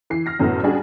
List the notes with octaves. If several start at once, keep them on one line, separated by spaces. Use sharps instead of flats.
E3 C7
F6 A#6 C7
F#2 A2 A3 B3
G3 C#4 D4 F#4 G#4